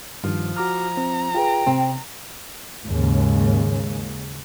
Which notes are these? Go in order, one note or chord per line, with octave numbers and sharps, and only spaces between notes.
G2 D#3 F3
F#4 A#5 D6 F6
C4
F4 G#4 B4 G5
C3 C4
D#2 G#2 C#3